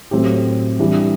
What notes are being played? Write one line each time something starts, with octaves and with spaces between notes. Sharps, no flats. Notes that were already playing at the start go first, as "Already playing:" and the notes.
A2 F#3 C4 E4 G4
E3 G3 D4 G4